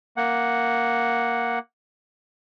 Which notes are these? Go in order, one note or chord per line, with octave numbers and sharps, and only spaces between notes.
A#3 F#5